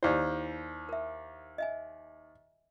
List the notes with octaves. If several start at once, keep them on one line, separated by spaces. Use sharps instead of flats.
D#2 E4 C5 D5
A#4 E5
D#5 E5 G#5